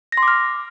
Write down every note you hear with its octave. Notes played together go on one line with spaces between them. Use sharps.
A#6
C6
D6
F6